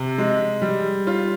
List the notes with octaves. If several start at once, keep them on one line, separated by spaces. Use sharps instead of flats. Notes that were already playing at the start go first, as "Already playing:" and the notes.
Already playing: C3
G#3
G3
F4